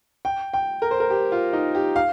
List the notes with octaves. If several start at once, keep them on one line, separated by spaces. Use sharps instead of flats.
G5
G5
A#4
C5
A#4
G4
F4
D#4
G4
F5